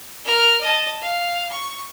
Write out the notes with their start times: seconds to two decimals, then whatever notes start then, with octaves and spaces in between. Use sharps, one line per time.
0.25 A#4 F6
0.61 D#5 A5
1.02 F5
1.51 C#6